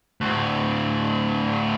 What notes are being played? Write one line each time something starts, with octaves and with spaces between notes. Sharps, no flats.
D2 A2